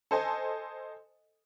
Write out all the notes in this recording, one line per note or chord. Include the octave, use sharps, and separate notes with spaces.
A4 C5 D#5 G#5